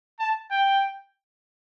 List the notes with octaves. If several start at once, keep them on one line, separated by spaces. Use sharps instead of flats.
A5
G5